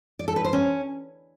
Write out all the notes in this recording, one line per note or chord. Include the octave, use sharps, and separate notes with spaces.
D5
A4
B4
C5
C#4